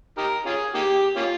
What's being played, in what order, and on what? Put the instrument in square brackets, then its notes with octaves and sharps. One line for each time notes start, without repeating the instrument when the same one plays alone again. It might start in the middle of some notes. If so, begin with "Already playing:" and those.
[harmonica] D#4 G4 A#4
C#4 F4 G#4
A#3 D#4 G4
A#3 C#4 F4